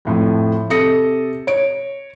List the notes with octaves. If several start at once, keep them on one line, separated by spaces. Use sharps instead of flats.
F2 A2 F3
C3 A4 D#6 A#6 C#7
C#5 D7